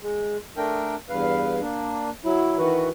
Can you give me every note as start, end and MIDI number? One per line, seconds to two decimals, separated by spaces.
0.03 0.37 56
0.57 0.95 57
0.57 0.95 62
0.57 0.95 70
0.57 0.95 79
1.09 1.60 40
1.09 1.60 43
1.09 1.60 71
1.09 1.60 77
1.61 2.10 58
1.61 2.10 62
2.25 2.57 54
2.25 2.57 64
2.58 2.89 51
2.58 2.89 52
2.58 2.89 66
2.58 2.89 71